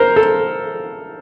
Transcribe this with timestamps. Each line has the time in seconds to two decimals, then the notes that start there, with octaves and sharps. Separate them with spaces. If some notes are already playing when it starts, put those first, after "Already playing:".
Already playing: A#4 C5
0.16 A4